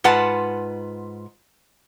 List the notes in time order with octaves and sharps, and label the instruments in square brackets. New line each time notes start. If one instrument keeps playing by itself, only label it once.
[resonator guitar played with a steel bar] G#2 F4 B4 F#5 A5